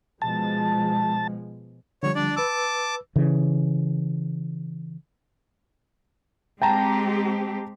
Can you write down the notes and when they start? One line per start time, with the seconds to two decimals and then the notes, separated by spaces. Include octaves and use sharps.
0.22 B2 F3 G#3 A5
2.03 D3 F3 G3 C#5
2.15 D4 D5
2.36 B4 A5 D6 E6
3.16 C#3 E3
6.62 G#3 C4 G4 G5 A5 A#5